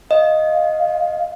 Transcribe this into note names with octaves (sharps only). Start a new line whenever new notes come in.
D#5 F5